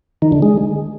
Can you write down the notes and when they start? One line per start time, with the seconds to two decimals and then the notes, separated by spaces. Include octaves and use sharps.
0.22 D#3
0.32 D3
0.42 G#3